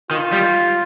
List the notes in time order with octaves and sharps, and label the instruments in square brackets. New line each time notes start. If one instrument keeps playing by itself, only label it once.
[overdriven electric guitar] D#3 [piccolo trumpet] F4
[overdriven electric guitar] G3